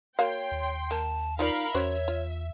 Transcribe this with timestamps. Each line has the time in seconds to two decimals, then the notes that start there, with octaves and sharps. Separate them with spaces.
0.19 A#3 F#4 C#5 F5 G5 C6
0.52 D#2
0.91 A#3 A5
1.39 D#3 D#4 F4 A#4 D5 F5 B5
1.74 E2 C#4 F#4 C5 C#5 E5
2.08 F4